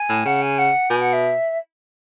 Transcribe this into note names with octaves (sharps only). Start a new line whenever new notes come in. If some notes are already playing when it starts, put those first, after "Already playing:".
Already playing: G#5
A2
C#3 F#5
G#5
F#5
B2 G#5
F#5
E5